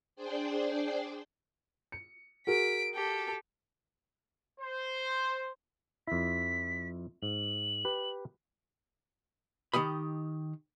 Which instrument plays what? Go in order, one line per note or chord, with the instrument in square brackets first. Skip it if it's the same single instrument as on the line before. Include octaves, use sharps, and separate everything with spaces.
[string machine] D4 G#4 C5 D5 G5 C6
[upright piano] C#7
[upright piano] F#4 G#4 A#4 [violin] B6 D7
[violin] G4 A4
[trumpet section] C5
[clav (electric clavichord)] F2 E4 [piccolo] B6
[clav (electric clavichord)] G#2 [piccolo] F#7
[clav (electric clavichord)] G4 B4
[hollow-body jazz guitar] D#3 G4 D#5 B5